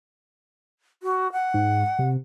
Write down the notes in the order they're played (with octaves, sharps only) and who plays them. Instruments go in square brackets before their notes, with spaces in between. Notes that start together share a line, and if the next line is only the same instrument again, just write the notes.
[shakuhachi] F#4
F#5
[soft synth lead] G#2
C3